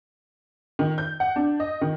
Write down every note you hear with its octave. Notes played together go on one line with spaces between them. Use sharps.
D#3
G6
F#5
D4
D#5
D#3